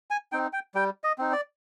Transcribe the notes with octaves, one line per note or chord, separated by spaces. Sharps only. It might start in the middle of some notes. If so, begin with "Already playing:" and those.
G#5
C4 D#4 G5
G5
G3 G5
D#5
C4 D#4
D5